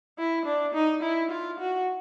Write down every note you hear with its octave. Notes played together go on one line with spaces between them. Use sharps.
E4
D4
D#4
E4
F4
F#4